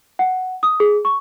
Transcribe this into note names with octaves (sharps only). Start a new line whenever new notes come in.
F#5
D#6
G#4
C#6